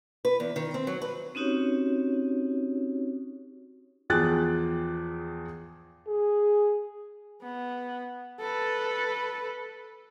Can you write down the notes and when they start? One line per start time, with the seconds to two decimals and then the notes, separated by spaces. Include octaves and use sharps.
0.25 B4
0.40 E2
0.56 D#3
0.74 C4
0.87 F#3
1.02 B4
1.35 C4 C#4 D#4 F#4 G4 C#5
4.10 E2 F3 G#4 G5 F#6 A6
6.07 G#4
7.42 B3
8.40 A4 B4